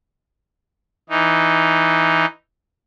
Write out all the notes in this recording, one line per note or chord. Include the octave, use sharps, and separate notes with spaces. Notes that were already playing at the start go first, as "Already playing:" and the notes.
E3 D#4